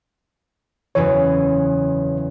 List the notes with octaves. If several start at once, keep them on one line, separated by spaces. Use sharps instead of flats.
F#1 E2 E3 C#5